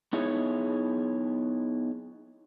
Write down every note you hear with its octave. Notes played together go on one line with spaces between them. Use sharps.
B3 D#4 E4 G#4 C#5